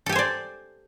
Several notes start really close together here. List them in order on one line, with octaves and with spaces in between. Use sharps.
A4 G4 G#5 C5 D5